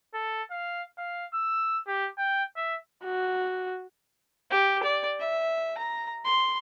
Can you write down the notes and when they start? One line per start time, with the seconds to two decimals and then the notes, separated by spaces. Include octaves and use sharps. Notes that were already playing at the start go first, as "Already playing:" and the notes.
0.14 A4
0.51 F5
0.98 F5
1.34 E6
1.87 G4
2.18 G5
2.56 E5
3.04 F#4
4.51 G4
4.83 D5
5.20 E5
5.78 A#5
6.25 C6